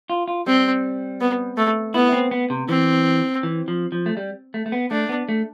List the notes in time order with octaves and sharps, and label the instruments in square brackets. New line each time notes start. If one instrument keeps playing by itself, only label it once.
[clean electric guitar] F4
F4
[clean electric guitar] G3 [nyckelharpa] C4
[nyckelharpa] B3
A3
[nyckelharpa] B3 [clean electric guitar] E4
[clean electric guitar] C4
B3
C3
[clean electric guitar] E3 [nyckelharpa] C4
[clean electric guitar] E3
F3
F3
A3
G3
A3
A3
B3
[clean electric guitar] A3 [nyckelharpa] D4
[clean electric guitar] B3
A3